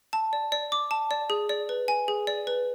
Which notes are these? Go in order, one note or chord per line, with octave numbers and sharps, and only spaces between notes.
A5
D5
D5
D6
A5
D5
G#4
D5
B4
G#5
G#4
D5
B4